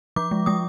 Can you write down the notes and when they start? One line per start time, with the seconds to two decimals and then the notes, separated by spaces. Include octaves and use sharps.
0.16 F3 D6
0.31 G#3
0.46 G#3 D#6